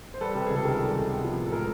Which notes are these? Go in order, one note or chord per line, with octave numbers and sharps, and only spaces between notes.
C5
G3 A4 B4
C3 G4
C#2 G#4
A4
D#3 G#4 A#4
G3
C3
B3
F3
A2
A4
G#3 G#4 A#4